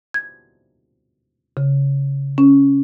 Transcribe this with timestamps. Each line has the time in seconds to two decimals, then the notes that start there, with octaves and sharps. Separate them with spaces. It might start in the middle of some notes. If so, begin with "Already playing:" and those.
0.14 G#6
1.57 C#3
2.38 C#4